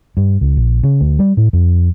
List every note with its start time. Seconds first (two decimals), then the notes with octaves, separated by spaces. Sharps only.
0.17 G2
0.41 C#2
0.57 A#1
0.83 C#3
1.01 D2
1.19 G3
1.37 A2
1.53 F2